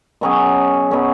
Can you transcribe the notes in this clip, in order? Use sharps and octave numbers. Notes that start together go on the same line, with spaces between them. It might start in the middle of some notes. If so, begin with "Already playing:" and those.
B2 F#3 C#4 G#4
B2 F#3 C#4 G#4